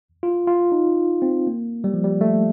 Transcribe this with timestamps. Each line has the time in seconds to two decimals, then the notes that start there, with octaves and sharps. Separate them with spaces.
0.23 F4
0.47 F4
0.72 D#4
1.22 C4
1.47 A#3
1.84 G3
1.94 F3
2.04 G3
2.21 A3